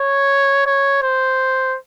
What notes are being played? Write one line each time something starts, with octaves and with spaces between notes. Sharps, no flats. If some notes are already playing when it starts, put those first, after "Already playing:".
Already playing: C#5
C#5
C5